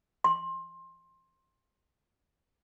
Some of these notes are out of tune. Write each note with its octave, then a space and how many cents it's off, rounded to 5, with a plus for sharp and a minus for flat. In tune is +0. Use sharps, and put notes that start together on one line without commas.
C6 +20